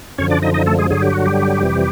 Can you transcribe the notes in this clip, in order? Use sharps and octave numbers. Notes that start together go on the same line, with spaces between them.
F#2 D3 F3 C#4 C#5
D4 D5
D#4 D#5
D#4 D#5
A3 A4
G#3 G#4
G2 D3 F#3 G#4
G4
F#4
G3 G4
F2 C3 E3